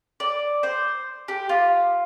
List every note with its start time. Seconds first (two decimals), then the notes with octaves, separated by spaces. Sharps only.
0.20 D5
0.63 C5
1.28 G4
1.49 F4